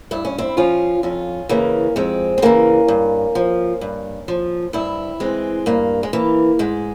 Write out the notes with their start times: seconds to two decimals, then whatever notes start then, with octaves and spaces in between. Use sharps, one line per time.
0.11 G2 E4
0.25 C#4
0.38 C4 E4
0.57 F3 C#4 F4
1.03 F2 C#4 F4
1.49 C#3 E3 A#3 C#4
1.96 F2 G#3 C4
2.38 C4
2.42 C#3 E3 A#3 C#4
2.88 G2
3.35 F3
3.81 G2
4.28 F3
4.73 G2 C4 E4
5.20 E3 G#3 C4
5.66 G2 A#3
6.03 G#3
6.13 E3 A#3
6.59 G#2 G#3